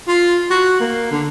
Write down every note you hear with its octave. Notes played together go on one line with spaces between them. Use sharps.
F4
F#4
A#3
D3